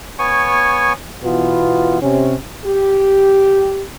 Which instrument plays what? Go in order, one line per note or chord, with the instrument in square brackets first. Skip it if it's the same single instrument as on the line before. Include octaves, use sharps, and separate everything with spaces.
[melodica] B3 C#5 G#5 C#6
[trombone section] B2 E3 B3 F4
C3 C#4
[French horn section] G4